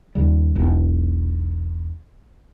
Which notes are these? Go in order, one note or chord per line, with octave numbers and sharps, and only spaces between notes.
D#2 C#3 G3
E1 B1